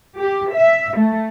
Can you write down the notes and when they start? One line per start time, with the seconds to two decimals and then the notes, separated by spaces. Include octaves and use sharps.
0.20 G4
0.53 E5
0.97 A3